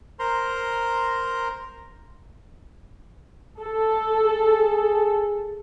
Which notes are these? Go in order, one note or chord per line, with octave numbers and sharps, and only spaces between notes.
A#4 C5 A#5 C6
A4
G#4